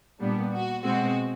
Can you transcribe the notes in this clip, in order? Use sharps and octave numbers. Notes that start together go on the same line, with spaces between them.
A#2 G3 B3 D4
F#4
B2 G#3 C4 F#4